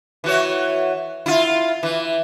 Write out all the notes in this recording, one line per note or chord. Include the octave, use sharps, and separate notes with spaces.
E3 F#4 C#5
E4 F4
E3